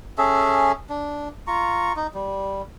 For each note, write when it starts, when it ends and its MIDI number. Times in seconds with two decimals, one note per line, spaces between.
0.18 0.72 61
0.18 0.72 68
0.18 0.72 69
0.18 0.72 76
0.90 1.28 62
1.47 1.93 65
1.47 1.93 82
1.47 1.93 85
1.96 2.07 63
2.14 2.62 55